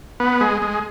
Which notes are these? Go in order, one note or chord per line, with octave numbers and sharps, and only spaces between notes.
B3
G#3
G#3